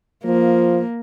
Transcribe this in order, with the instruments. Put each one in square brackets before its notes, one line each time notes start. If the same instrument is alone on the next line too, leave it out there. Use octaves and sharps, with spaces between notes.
[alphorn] F3 [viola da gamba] A#3